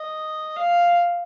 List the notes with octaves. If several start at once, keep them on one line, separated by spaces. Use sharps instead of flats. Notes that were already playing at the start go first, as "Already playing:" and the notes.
Already playing: D#5
F5